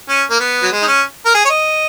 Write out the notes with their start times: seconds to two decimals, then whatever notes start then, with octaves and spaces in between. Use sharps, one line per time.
0.08 C#4
0.30 A#3
0.40 B3
0.63 F#3
0.72 G#3
0.82 D#4
0.87 C#4
1.25 A#4
1.34 G#4
1.45 C#5
1.49 D#5